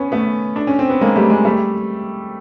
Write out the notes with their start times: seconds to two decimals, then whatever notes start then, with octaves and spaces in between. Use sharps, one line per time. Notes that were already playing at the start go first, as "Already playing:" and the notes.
Already playing: B3 C#4
0.12 A3 B3
0.56 D4
0.67 C#4
0.79 C4
0.90 B3
1.01 G#3 A#3
1.16 G3 A3
1.30 G#3
1.45 G3 A3